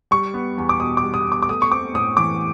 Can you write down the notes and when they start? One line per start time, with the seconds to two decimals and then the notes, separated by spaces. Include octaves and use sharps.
0.11 G3 C#6
0.34 B3
0.58 E2
0.69 D6
0.80 B2 D#6
0.97 D6
1.03 G3
1.14 D#6
1.26 B3
1.32 D6
1.42 D6
1.48 A3 D#6
1.62 C#6
1.71 C4 D6
1.94 A2 D#6
2.17 E3 D6